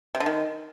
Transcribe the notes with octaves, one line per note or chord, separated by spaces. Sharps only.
C3
D3
D#3